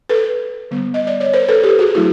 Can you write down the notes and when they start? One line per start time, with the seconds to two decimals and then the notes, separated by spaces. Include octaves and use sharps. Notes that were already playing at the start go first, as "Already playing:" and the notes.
0.09 A4 B4
0.71 D3 G3 B3
0.94 D#5
1.07 D5
1.20 C#5
1.33 A#4 C5
1.48 A4 B4
1.63 G4 A4
1.79 F#4 G#4
1.95 F#3 A3 D4 E4 F#4